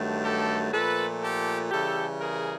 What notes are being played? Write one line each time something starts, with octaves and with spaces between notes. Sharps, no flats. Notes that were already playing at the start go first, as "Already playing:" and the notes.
Already playing: G2 D#3 F#3 A3
G4 A4
A#2 F3 A3 A4 B4
G4 A4
C#3 E3 G3 G4 A4
G#4 A#4